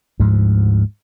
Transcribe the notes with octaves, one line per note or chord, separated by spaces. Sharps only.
D2 G#2 F3